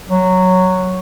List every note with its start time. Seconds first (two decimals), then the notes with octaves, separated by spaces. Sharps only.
0.08 F#3